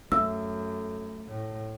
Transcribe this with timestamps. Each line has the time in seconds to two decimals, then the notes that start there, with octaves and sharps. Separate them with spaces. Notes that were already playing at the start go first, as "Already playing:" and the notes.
0.12 F#2 A3 E6
1.28 A2